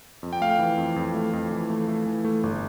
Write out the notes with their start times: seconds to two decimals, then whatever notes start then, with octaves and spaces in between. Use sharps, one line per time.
0.23 F2
0.33 G5
0.41 A3 F5
0.51 G5
0.59 E3
0.77 F2
0.96 F2
1.15 A3
1.33 F2
1.51 E3
1.70 A3
1.88 A3
2.06 E3
2.25 A3
2.43 G1